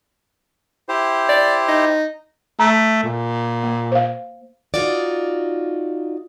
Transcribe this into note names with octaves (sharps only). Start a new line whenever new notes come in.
E4 G4 C5
D5
D#4
A3 A#5
A#2
A#3
C5 F5
D#4 F4 F#4 D5